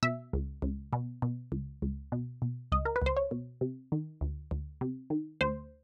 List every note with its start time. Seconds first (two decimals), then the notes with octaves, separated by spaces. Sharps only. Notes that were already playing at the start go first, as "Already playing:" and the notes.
0.03 B2 E5
0.33 C#2
0.62 C#2
0.93 B2
1.22 B2
1.52 C#2
1.82 C#2
2.12 B2
2.42 B2
2.72 C#2 D#5
2.85 A#4
2.96 B4
3.02 C#2 C5
3.17 C#5
3.31 B2
3.61 C3
3.92 D#3
4.21 D2
4.51 D2
4.81 C3
5.10 D#3
5.41 D2 C5